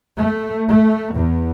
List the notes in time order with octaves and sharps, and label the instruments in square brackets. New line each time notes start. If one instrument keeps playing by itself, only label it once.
[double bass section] A3
A3
E2